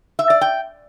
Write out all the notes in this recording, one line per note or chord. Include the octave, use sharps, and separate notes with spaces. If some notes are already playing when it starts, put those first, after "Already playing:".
E5
D5
G5